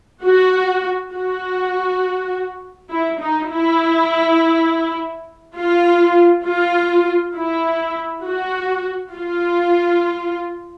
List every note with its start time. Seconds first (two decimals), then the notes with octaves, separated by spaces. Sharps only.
0.24 F#4
1.14 F#4
2.91 E4
3.20 D#4
3.50 E4
5.57 F4
6.45 F4
7.35 E4
8.24 F#4
9.12 F4